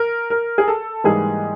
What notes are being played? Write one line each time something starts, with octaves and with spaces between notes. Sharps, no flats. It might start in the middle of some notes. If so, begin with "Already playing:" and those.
Already playing: A#4
A#4
G#4
A4
G#2 E3 G3 A#3 G#4